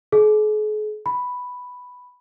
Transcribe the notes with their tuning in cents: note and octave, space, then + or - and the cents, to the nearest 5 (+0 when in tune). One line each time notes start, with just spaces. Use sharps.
G#4 +45
B5 +0